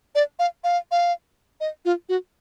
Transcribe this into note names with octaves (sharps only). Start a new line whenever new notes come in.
D5
F5
F5
F5
D#5
F4
F#4